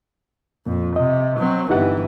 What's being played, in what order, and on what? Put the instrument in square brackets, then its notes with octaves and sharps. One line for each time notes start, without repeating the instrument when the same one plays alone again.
[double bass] F2 [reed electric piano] A#2
[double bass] C3 [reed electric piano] D#5
[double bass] F#3 C4
[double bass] G1 E3 [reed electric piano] D#4 G4 F#5